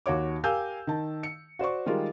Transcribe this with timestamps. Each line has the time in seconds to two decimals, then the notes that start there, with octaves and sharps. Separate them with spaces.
0.06 D#2 F#4 C#5 D6
0.44 G4 A#4 F5 G#5 E6 G6
0.87 D#3 A5
1.23 C#7
1.59 F#4 C5 D5 C#6
1.86 D#3 G3 G#3 F4 A#4